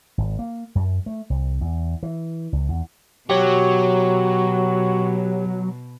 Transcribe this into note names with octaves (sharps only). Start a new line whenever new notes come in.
G#1
A#3
F#2
A3
C2
E2
E3
C#2
E2
B2 F#3 F#4 G4 C#5